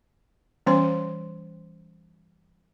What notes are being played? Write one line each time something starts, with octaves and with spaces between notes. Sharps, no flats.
E3 G3 B3 C#4 C5 C6